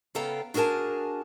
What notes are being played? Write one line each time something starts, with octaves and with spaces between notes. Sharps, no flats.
C#3 B3 A4 F5 G5 A#5
D4 F#4 G#4 A#4 G#5 A5